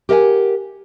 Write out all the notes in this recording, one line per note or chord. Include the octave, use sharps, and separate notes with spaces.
G4 A#4 D#5 E5 F#5 G#5